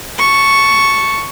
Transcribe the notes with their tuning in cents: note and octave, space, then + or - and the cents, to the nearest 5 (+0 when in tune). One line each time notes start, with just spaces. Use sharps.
A5 +0 C#6 +0